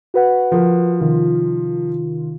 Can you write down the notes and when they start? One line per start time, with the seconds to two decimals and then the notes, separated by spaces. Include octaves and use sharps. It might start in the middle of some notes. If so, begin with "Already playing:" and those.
0.14 F#4 B4 F#5
0.52 F3 A#4
1.00 C3 D#3 F4